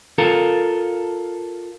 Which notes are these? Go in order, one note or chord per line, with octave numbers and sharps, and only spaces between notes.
F4 A4 A#4